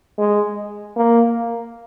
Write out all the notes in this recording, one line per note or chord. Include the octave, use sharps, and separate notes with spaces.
G#3
A#3